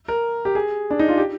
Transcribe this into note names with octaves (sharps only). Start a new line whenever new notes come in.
A#4
G4
G#4
D4
D#4
F4
G4